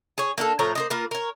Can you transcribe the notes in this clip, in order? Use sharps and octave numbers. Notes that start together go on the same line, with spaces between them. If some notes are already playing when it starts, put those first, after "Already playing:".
G#4 C#5
A#3 D4 G4 A4
A2 F3 C#5 A#5
A#3 C5 D#5
A#3 F4 A#4 B4
A#4 C#5